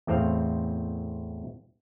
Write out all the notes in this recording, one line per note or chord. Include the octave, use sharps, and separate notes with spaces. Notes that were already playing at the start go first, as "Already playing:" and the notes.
E2 A2 C4 C5 F5